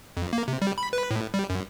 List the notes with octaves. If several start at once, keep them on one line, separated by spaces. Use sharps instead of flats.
F2
A#3
C3
G3
B5
B4
A2
G3
F#2